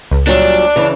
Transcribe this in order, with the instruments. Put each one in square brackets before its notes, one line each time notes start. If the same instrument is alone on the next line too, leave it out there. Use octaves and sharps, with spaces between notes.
[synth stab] C#2
[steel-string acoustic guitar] A#2 F#3 G3 [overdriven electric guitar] D4
[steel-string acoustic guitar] C#3 E3